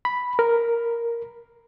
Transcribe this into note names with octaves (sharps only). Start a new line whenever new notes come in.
B5
A#4